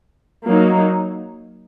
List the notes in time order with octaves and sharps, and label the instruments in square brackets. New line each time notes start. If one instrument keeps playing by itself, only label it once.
[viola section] F#3 A#3 D#4